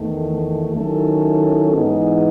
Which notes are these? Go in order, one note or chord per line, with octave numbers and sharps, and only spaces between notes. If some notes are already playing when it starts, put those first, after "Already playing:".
Already playing: E2 D#3 A3
D#3 F#3 C#4 E4 A4
G#2 E3 B3 D#4 G#4